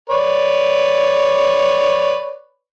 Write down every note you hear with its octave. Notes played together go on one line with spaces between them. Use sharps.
B4 C#5 D5